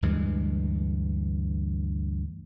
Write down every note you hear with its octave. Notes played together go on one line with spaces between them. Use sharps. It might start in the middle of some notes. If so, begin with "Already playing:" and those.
D2 G2 E3 G#3